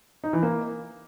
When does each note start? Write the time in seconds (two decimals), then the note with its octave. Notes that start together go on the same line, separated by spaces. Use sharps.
0.24 D#4
0.33 E3
0.43 A#3